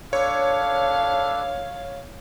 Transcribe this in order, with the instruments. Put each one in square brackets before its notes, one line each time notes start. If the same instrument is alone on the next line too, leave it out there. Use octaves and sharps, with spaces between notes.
[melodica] D4 A4 B4 [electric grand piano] C#5 [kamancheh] F5